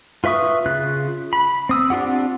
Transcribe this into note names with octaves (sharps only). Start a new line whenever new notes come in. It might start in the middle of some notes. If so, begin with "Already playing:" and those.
F4 B4 E5 C#6 D#6
C#3 F4 F#6
B5
C4 D#6 E6
C4 D4 F4 G4 F#5